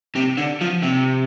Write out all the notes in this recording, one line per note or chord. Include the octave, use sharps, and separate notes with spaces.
C3
D3
F3
C3